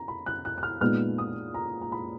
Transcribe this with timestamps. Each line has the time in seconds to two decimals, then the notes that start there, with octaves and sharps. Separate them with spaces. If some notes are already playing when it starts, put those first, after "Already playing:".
Already playing: A#5
0.08 B5
0.26 F#6
0.45 F#6
0.58 F#6
0.63 F6
0.81 A#2 G#3 B3 D#4 F6
1.18 D#6
1.54 A#5
1.82 A#5
1.92 B5